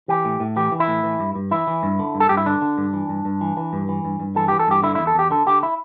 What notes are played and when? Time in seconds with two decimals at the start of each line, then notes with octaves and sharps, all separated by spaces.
0.08 E3 G4
0.25 A2
0.40 A2
0.56 E3 G4
0.72 E3
0.80 E4
0.88 A2
1.04 E3
1.20 G2
1.35 G2
1.51 E3 E4
1.67 E3
1.83 G2
1.99 D3
2.15 G2
2.20 A4
2.29 G2 G4
2.37 E4
2.46 D3 D4
2.62 D3
2.78 G2
2.93 E3
3.09 G2
3.25 G2
3.41 E3
3.57 E3
3.73 G2
3.89 E3
4.05 G2
4.20 G2
4.36 E3 A4
4.48 G4
4.52 E3
4.59 A4
4.67 G2 G4
4.83 D3 E4
4.95 E4
4.99 E2
5.07 A4
5.15 E2 G4
5.31 D3 A4
5.46 D3 G4
5.63 E4